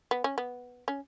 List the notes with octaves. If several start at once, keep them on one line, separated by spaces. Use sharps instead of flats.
B3
C#4
B3
C#4